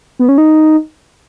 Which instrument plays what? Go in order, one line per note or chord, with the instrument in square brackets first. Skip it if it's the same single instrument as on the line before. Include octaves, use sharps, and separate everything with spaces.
[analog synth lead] B3
C#4
D#4